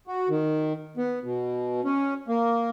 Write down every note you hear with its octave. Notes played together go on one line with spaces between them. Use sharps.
F#4
D#3
B3
B2
C#4
A#3